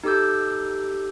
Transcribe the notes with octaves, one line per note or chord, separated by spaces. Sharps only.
D#4 G4 A4 D6 E6 G6